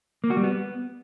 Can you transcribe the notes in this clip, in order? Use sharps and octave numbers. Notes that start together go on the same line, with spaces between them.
A#3
F#4
G3
B3